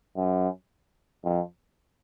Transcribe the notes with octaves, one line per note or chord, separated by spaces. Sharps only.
F#2
F2